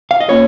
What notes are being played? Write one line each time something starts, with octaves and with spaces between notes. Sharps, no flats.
F5
D#5
A#3 C#4 F4 C#5